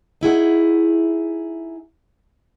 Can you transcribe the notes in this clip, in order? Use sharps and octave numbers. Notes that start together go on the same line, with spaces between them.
D#4 E4 G#4 F#5